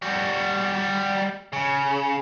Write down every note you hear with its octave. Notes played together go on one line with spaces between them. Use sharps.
G3 F#4
C#3